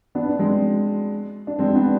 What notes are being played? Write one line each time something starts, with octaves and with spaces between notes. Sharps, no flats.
B3 D4
D4
G#3 C4
D4
G#3 C4
B3 D4